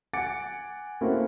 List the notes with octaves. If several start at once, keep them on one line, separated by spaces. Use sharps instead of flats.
F#5 G#5 D6 A6 C#7 D7
A3 A#3 C4 C#4 E4 F#4